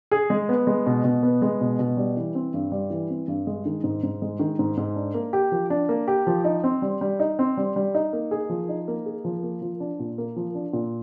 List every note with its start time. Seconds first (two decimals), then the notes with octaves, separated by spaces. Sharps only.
0.11 G#4
0.30 G#3
0.49 B3
0.67 G#3
0.86 B2
1.04 B2
1.23 B3
1.42 G#3
1.61 B2
1.79 B2
1.97 G3
2.17 E3
2.35 C4
2.54 G2
2.72 G3
2.90 E3
3.10 C4
3.28 G2
3.47 G#3
3.65 D#3
3.84 G#2
4.03 G#2
4.22 G#3
4.39 D#3
4.59 G#2
4.77 G#2
4.96 D4
5.14 A#3
5.33 G4
5.52 F3
5.70 D4
5.89 A#3
6.08 G4
6.27 F3
6.44 D#4
6.64 C4
6.82 G3
7.01 G3
7.20 D#4
7.39 C4
7.57 G3
7.76 G3
7.95 D#4
8.13 A#3
8.31 G#4
8.49 F3
8.69 D#4
8.88 A#3
9.06 G#4
9.25 F3
9.43 A#3
9.62 F3
9.80 D4
9.99 A#2
10.18 A#3
10.36 F3
10.55 D4
10.73 A#2